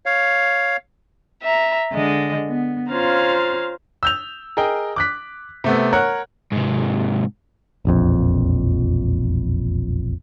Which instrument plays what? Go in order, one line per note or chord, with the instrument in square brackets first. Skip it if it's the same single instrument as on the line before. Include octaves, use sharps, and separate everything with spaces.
[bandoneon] C#5 F5
[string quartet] E5 A#5
D3 G#3 D#5
B3
C#4 F4 C5 F5 A#5
[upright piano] E6 G6 F7
G#4 A#4 D#5 G5
D6 F#6 B6
C3 A3 B3
A#4 C#5 F#5 F#6
[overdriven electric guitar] G#2 C3
[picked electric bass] E1 A#1 F2